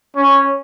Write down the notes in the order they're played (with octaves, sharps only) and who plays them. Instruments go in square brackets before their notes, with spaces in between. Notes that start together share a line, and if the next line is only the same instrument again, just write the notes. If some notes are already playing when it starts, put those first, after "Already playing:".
[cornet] C#4